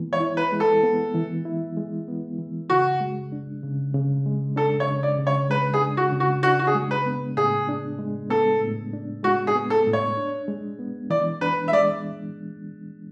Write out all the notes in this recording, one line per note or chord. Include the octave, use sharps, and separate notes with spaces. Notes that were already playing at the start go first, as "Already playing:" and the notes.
Already playing: E3 G#3 B3 E4
C#5
E4
B4
G#3
A4
B3
E3
E4
G#3
B3
E3
C#3 F#4
G#3
D4
C#3
C#3
G#3
D4 A4
C#5
C#3
D5
C#3
C#5
G#3 B4
G#4
D4
F#4
C#3
F#4
D4 F#4
F#4
G#4
G#3
B4
B3
A2 G#4
D4
G#3
B3 A4
A2
D4
G#3 F#4
G#4
B3
A4
A2
C#5
D4
G#3
B3
E3 D5
D4 B4
E5
G#3 D5